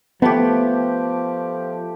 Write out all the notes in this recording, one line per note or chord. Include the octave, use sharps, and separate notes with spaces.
F3 A3 B3 G4